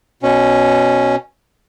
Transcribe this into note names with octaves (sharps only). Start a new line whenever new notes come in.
B2 C#4